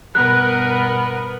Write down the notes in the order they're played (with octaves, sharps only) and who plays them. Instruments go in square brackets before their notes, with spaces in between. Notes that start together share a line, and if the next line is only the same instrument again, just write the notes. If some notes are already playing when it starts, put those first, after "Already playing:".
[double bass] G2 B2 [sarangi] B3 [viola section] A#4 B4 [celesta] F#6